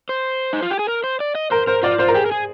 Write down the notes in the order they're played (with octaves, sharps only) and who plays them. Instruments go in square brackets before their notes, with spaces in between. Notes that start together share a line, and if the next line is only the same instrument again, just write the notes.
[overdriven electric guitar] C5
D#4
F4
G4
G#4
A#4
C5
D5
D#5
[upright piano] A#4 [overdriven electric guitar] C5
[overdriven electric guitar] A#4 [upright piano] C5
[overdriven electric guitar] F4 [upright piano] D5
[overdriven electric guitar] F4 [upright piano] C5
[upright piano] A#4
[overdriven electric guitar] G4 [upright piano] G#4
[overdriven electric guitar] A#4
G#4